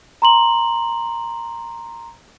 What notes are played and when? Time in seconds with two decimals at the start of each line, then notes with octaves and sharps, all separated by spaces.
0.22 A#5 C6 F#7